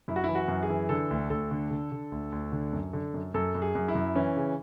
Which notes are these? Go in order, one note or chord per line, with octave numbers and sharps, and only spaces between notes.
F#2 E4
F#4
E4
E3
F#4
F#2
G#4
E3
D3 A4
D2
D2 A4
D3
D3
D3
D2
D2
D3
F#2
D3
F#2
F#2 A4
F#2
G#4
F#2
E4
F#2
E3 C#4
C#3